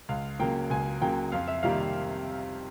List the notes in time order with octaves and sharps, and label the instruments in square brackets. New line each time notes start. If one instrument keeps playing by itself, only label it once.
[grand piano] C#2 F5
C#3 F#3 A#3 G5
C#2 G#5
C#3 F#3 A#3 G5
F2 F5
E5
C3 D#3 G3 A#3 F5